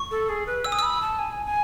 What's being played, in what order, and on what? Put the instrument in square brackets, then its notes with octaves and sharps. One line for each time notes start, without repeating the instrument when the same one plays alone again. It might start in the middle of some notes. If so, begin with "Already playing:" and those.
Already playing: [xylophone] C#6
[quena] A4
G#4
B4
[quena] G#5 [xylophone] E6
[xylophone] D#6
[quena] B5 [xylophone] E6
[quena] A5
G#5
G#5